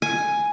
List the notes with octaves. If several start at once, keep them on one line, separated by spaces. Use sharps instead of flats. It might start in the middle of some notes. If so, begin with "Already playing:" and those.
G#5